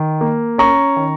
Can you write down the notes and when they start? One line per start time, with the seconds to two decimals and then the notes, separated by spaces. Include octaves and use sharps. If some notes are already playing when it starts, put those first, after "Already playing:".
Already playing: D#3
0.21 A#3
0.58 C#4 A#5 C#6
0.97 D#3